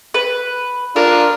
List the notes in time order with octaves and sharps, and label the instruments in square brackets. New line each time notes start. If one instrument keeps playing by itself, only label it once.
[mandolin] B4
[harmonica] D4 F4 [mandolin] A#4